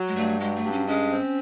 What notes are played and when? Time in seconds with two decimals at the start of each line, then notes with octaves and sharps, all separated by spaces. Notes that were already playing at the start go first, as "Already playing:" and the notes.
Already playing: F#3
0.08 G#3
0.16 G2 A3
0.40 F#3 G#3
0.56 A3
0.63 G2
0.72 C#4
0.87 G#3 C#4
1.11 C4